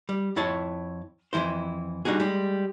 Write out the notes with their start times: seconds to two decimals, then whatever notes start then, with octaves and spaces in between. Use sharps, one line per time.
0.09 G3
0.36 F2 E4 C#5 A5
1.33 F2 C3 E3 E4 C5
2.05 G3 D4 D#4 F#4 G#4
2.20 G3 G#3